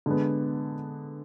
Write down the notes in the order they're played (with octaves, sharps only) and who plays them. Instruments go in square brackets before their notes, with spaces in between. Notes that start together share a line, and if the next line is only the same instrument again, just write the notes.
[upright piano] D3 G#3 B3